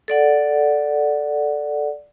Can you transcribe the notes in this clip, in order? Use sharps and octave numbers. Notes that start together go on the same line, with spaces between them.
A4 D5 F#5